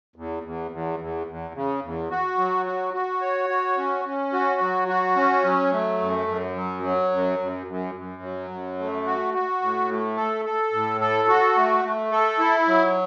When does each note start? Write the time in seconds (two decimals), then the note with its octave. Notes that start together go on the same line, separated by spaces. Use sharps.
0.16 E2
0.43 E2
0.71 E2
0.99 E2
1.27 E2
1.54 C#3
1.83 E2
2.11 F#4
2.38 F#3
2.66 F#4
2.94 F#4
3.21 C#5
3.50 F#4
3.77 C#4
4.05 C#4
4.33 F#4
4.61 F#3
4.88 F#4
5.16 C#4
5.44 F#3
5.72 A3
6.00 F#2
6.28 F#2
6.56 F#3
6.83 F#3
7.12 F#2
7.39 F#2
7.67 F#2
7.95 F#2
8.22 F#3
8.50 F#2
8.78 A3
9.06 F#4
9.34 F#4
9.62 A2
9.89 A3
10.17 A4
10.45 A4
10.72 A2
11.01 A4
11.28 F#4
11.56 A3
11.84 A3
12.12 A4
12.39 E4
12.67 F#3